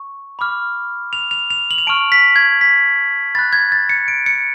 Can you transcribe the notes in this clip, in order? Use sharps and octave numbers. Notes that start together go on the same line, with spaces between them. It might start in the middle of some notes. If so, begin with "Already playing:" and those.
Already playing: C#6
B5 D6 F6
F7
F7
F7
F#7
F7
A5 C#6 F6 D7
B6
G#6
B6
B5 F#6 A6
G#6
A6
C#7
D7
C#7